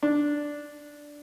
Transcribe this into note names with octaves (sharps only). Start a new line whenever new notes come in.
D4